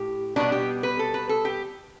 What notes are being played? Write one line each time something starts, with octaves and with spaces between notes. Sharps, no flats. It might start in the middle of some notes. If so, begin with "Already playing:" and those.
Already playing: A2 G4
B2 G3 B3 D4
G4
B4
A4
B4
A4
G4